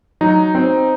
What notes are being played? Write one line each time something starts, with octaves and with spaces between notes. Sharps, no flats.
F#3 D#4
C4